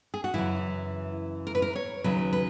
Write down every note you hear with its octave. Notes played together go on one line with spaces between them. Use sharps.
G#4
F#4
F#2 C#3 E3 E4
A#4
B4
A#4
C#5
D#2 C#3 F#3 B4
B4